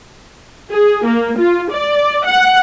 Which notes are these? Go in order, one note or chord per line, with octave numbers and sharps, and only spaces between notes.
G#4
A#3
F4
D5
F#5